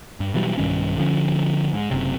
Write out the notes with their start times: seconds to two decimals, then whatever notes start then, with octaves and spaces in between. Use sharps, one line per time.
0.20 G2
0.34 B2 E3 F#3 G3
0.58 B1 G2 D#3 C#4
0.98 D3 F3 C#4
1.73 G#2
1.91 F#1 C3